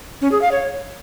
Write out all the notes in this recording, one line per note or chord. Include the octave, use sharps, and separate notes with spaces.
C#4
G#4
F5
C#5